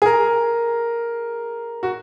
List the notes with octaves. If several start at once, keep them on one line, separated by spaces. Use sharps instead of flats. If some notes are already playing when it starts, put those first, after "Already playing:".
G#4
A#4
F#4